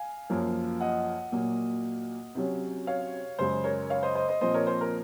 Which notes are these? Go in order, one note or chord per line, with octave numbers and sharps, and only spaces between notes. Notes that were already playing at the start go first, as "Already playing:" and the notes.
Already playing: F5 G#5
F#2 F3 A#3
D#5 F#5
A#2 F#3 A#3
C3 F#3 C#4
C#5 F5
F#2 C#3 G#3 C5
A#4 C#5
C#5 F5
C5 D#5
C5 D#5
C5 D#5
A#2 F3 C4 C5 D#5
A#4 C#5
C5
A#4